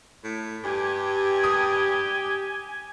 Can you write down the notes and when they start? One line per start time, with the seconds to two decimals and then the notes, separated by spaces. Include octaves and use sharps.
0.24 A2
0.64 G2 G4 G#5
1.44 D#6